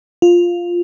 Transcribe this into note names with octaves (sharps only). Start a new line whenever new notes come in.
F4